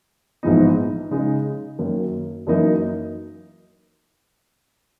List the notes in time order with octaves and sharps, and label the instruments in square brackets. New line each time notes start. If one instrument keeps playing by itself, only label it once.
[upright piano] A#1 G#2 E3 B3 D#4
C#3 G#3 D#4
F#2 D#3 A#3
F#2 E3 A#3 D#4